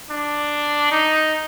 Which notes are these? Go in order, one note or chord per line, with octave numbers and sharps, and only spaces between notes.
D4
D#4